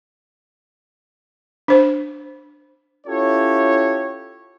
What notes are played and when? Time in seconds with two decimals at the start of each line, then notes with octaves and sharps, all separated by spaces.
1.68 D4 C5
3.07 C#4 E4 F4 G4 A4 C#5